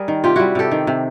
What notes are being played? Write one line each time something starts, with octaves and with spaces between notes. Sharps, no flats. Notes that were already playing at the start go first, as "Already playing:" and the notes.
Already playing: G3 G#4 A#4
D#3
C3 F4 G4
G3 E4 F#4
C3 G4 A4
D#3
C3